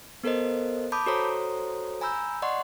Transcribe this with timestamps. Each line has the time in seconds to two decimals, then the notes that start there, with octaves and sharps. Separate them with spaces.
0.24 B3 A4 A#4 C5 D#5
0.92 A5 B5 D6 D#6 G6
1.06 F#4 A4 C5 C#5 A#5 D#6
2.01 G#5 A#5 B5 E6 G6
2.42 D5 D#5 F#5 C6 C#6